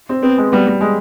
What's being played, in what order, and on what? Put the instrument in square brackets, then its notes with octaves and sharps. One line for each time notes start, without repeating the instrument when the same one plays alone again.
[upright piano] C4
[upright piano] B3 [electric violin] C4
[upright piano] G#3
[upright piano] G3 [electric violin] B3
[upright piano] G3
G#3